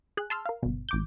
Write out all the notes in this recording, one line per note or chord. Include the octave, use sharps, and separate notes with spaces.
G#4 F#6
A5 C6 E6 F6
A#4 F5
G1 B2
A1 D6 G6